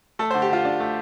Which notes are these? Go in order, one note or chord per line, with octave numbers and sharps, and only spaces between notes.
A3 A4
C5
D3
G4
D3 F4
D4
A3